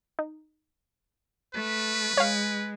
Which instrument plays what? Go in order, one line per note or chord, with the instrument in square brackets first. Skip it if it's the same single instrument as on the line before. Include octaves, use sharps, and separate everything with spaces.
[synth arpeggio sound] D#4
[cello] A3 [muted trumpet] B4
[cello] G#3 [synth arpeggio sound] C#5 F5